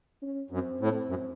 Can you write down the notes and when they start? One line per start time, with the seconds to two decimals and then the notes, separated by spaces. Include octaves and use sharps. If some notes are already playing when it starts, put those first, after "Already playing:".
0.22 C#4
0.51 F#2 C4
0.81 A2
1.09 F#2